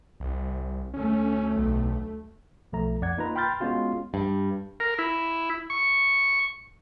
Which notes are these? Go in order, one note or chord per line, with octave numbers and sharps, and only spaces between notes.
C2
D2 A3 C#4
B1
B1 F3 A3 A#5
F2 D5 F#5 G#6
A#3 D#4 F4 B4 A#5
G5 B5 C6 F6 G6 A6
G#3 B3 C#4 F4 F#4
G2
A#4
E4
C#6